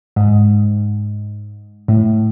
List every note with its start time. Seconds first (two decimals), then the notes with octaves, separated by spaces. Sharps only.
0.16 G#2
1.88 A2